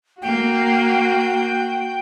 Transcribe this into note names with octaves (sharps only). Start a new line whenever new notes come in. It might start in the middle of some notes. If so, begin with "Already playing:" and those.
A#3 F#4 G5